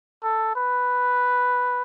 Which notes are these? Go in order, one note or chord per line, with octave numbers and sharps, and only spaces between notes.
A4
B4